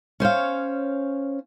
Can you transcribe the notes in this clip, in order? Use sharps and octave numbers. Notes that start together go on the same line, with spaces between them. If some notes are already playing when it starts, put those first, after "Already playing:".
C#4 C5 C#5 F5